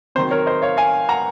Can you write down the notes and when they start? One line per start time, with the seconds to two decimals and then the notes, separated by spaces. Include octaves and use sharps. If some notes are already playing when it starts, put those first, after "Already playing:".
0.15 C3 D#3 F#3 C5
0.31 A#4 C#5
0.46 C5 D#5
0.62 C#5 F5
0.77 F5 G#5
1.09 F#5 A#5